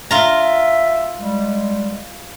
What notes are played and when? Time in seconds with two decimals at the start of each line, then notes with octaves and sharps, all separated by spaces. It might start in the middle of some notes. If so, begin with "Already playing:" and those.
0.11 F4 E5 A#5
1.19 G3 G#3